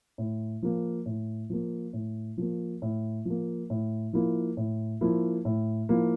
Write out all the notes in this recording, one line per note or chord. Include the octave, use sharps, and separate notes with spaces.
A2
F3 A#3
A2
F3 A#3
A2
F3 A#3
A2
F3 A#3
A2
F3 A#3 E4
A2
F3 A#3 E4
A2
F3 A#3 E4